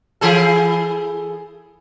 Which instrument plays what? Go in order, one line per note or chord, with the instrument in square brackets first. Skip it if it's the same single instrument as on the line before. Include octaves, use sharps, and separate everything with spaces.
[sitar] E3 G#4 A4